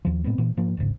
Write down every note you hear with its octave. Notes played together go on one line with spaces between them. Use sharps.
D#2 F3
A2 G#3 B3 C4
A#2 E3
G#2 F3 A#3
D1 G1 G#2 C#3